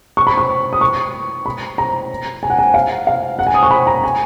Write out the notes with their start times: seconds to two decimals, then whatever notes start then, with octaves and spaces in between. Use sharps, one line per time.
0.17 C#6
0.27 B5
0.38 C#6
0.73 D#6
0.81 C#6
1.46 B5
1.78 A#5
2.43 G#5
2.50 F#5
2.59 G#5
2.74 F5
3.07 F5
3.39 F#5
3.47 G#5
3.54 D#6
3.63 C#6
3.71 B5
3.87 A#5
4.04 G#5